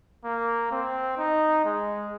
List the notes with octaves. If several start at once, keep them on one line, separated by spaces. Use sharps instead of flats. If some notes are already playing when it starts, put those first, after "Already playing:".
A#3
C4
D#4
G#3